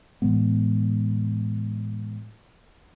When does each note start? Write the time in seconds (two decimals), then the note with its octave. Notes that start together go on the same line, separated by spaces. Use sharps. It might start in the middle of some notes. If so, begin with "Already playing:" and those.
0.22 A2 E3 G#3 B3